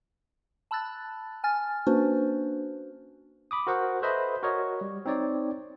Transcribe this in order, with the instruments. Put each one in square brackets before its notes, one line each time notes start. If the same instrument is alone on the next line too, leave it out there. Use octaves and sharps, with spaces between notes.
[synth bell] A5 B5 E6 F#6 A6
G#5 F6 A6
A#3 C#4 D4 F#4 B4 C5
[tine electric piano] B5 D6 D#6
F#4 A#4 C5 F#5
A4 B4 C5 D#5 E5 B5
F#4 A#4 C#5 D#5
G3
C4 D#4 C#5 D5